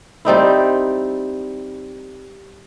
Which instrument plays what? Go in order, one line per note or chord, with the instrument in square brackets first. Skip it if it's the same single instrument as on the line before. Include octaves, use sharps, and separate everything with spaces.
[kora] G3 C4 D#4 E4